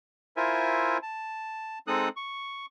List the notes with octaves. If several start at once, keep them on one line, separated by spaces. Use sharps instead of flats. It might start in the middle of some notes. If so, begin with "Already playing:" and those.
E4 F4 A#4 C5 E5 G#5
A5
G#3 C4 D#4 A4 D#6 F#6
C#6